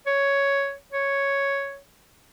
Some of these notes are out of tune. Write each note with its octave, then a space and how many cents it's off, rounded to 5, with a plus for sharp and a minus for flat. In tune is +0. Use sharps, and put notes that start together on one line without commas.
C#5 +5
C#5 +0